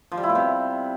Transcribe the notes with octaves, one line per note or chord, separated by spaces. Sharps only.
F3
G3
E4
B2
C3